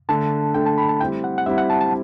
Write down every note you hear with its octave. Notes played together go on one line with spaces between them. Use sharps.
D3 A3 D4 A4 A5
D3 A3 D4 A4 G5
A5
B5
A5
G3 C4 E4 G5
F#5
F#5
G3 C4 E4 E5
F#5
A5
A5